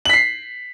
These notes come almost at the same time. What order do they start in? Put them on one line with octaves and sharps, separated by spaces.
F#7 B6 C7